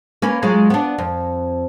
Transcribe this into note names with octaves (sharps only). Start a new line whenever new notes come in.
A#3 C#4 B4
F#3 G#3 F4
B3 D4
F2